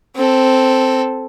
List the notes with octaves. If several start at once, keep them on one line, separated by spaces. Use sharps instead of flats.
C4 A4